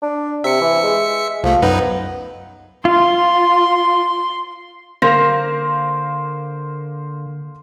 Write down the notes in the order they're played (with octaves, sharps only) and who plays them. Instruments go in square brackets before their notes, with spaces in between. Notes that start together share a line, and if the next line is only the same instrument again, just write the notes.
[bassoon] D4
[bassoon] C3 [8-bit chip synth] E5 C#7
[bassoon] E3
G#3
[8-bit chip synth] C2 A3 [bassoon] F3
[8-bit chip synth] F#2 D#4 B4 [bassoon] B3
[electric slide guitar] F4 [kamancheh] C6
[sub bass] D3 [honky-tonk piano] A#3 A#6 F7 [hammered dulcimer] C5